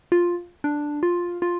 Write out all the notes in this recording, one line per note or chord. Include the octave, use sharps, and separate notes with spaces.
F4
D4
F4
F4